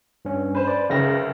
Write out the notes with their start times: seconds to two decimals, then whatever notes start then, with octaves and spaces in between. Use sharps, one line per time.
0.25 G2 C#4
0.55 B4 C5
0.67 D5
0.90 C#2 F#2 C#3 A#6